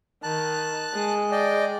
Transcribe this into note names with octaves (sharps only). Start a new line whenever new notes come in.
D#3 A5 F#6
G#3
D5 D#5 G5